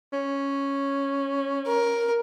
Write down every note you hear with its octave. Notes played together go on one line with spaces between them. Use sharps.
C#4
A#4